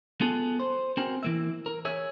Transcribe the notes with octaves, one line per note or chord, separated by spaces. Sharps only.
B3 F4 G#4 A4
C5
C4 F#4 G#4 A#4
E3 A#3 E5
A#4
G#4 C#5 E5